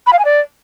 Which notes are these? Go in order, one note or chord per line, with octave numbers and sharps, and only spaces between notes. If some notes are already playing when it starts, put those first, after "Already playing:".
B5
F5
G#5
D5